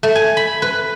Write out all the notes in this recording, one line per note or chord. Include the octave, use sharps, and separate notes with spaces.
A3
G#5
B5
B4